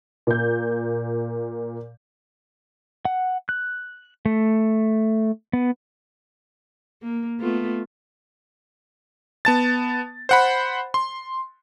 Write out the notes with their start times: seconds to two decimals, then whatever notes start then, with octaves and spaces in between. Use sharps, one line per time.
0.27 A#2 G6
3.05 F#5
3.49 F#6
4.26 A3
5.53 B3
7.02 A#3
7.40 A3 B3 F4
9.45 B3 A5 A6
10.29 C5 F#5 B5
10.94 C6